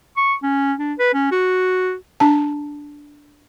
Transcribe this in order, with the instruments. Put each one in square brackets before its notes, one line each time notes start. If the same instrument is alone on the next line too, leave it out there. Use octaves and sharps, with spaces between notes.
[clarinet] C#6
C#4
D4
B4
C#4
F#4
[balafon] D4 A5